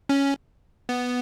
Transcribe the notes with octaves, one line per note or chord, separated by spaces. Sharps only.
C#4
B3